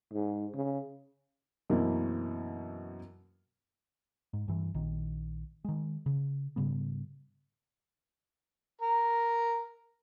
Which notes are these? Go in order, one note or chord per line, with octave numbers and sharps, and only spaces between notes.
G#2
C#3
F#2 B2 E3 F#3 A#3 C4
G#2
G2 E3
A#1 D#3
D#3 G#3
C#3
G#2 C#3 G3 B3
A#4